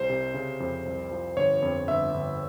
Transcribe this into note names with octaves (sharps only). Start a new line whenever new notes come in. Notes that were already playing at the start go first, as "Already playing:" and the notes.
Already playing: C2 C5
C3
C#3
F2
C2
F3
G1 C#5
F2
G1 E5
G1